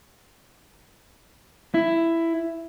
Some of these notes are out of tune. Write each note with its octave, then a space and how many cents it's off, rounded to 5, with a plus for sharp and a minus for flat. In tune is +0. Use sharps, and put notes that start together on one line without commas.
E4 +10